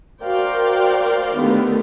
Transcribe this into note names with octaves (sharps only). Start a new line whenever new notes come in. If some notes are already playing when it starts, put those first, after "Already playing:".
F#4 A#4 C5 D5 F5 G5
D3 D#3 A3 B3 G4 A#4